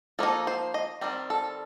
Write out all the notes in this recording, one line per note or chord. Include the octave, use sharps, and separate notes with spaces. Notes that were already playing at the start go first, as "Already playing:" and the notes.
F3 A#3 D#4 A4
C5
D#5
D#3 G3 C4
A4